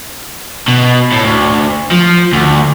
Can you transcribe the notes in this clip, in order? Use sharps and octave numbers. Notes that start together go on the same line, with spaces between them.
B2
A2
D2
F3
D2